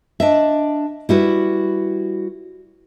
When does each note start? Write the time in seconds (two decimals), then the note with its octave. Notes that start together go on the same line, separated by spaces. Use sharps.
0.20 D4 D#5 E5
1.09 G3 E4 F#4 B4